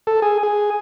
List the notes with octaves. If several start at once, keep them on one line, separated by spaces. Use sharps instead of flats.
A4
G#4
G#4